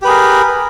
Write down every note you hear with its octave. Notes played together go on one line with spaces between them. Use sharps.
G4 G#4 A#4 B4